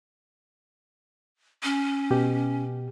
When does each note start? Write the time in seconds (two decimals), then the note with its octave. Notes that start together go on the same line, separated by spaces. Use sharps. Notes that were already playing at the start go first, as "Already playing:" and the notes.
1.63 C#4
2.11 B2 G4